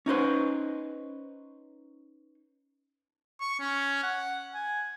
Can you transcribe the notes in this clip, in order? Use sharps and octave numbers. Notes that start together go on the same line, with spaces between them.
C#4 D#4 B4 C5
C#6
C#4
F#5
G#5